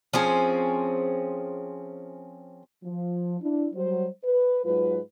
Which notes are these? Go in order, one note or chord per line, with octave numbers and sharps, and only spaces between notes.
F3 C4 C#4 G#4
F3
D4 E4
F#3 G3 C5
B4
G#2 F#3 F4 B4